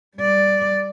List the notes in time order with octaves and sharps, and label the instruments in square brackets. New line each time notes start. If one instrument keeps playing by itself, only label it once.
[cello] G3 D5